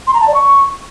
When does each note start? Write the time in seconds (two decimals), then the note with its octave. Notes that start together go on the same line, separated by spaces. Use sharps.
0.07 C6
0.14 A#5
0.21 A5
0.28 D5
0.34 C#6